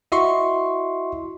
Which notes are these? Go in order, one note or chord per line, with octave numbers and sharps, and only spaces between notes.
E4 F#4 D#5 E5 C6 C#6